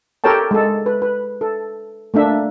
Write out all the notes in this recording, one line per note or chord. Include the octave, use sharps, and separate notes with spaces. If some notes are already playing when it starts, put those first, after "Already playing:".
G4 A4 A#4 C#5 G5 A5
G#3 A4
B4
B4
A4
A3 A#3 D4 E5